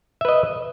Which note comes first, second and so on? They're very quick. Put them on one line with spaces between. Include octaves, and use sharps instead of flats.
E5 B4 D#5